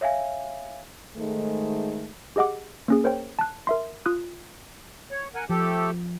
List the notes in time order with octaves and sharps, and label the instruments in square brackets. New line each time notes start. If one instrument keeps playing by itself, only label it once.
[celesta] C#5 E5 F5 G#5
[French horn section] G#2 D#3 G#3 A3
[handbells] G4 G#4 D#5 F#5 D6
A#3 C#4 G#4
A#4 C5 C#5 G5
A5 F#6
A#4 E5 C6
F4 D#6 F#6
[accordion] C#5
A#4 F#5 G#5
[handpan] F3 [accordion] A3 G4 A4